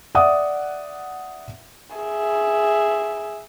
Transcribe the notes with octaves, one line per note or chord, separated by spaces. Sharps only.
D5 E5 F#5 D#6
G#4 E5